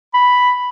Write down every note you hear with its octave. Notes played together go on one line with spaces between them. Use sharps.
B5